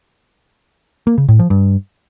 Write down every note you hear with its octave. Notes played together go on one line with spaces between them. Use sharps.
A#3
C#3
A2
F3
G2